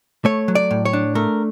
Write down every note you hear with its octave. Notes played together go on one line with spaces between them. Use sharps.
A3 C#5
F#3
D5
A2
C#5
D4
A3 A#4